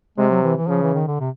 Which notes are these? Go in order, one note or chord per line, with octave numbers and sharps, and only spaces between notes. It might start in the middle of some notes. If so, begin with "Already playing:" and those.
C3 G#3
F#3
E3
E3
C#3 F3
E3
D#3
D3
C3